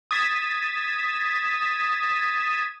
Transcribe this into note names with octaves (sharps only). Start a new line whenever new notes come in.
D#6 G#6 A6 B6 D#7 E7